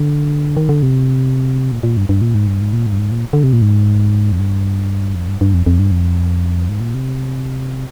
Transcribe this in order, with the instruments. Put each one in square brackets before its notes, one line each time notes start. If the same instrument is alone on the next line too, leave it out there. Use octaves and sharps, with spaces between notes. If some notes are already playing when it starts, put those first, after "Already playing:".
Already playing: [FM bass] D3
D#3
D3
C3
A#2
A#2
G2
G2
A#2
G#2
G2
G#2
A#2
G#2
G2
G#2
A#2
D3
C3
A#2
G#2
F2
G2
F2
G2
G2
F2
F2
G2
F2
G#2
A#2
C3